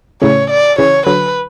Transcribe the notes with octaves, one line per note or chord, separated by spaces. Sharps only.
A2 C#3 C#5
D5
C#3 E3 C#5
D3 F#3 B4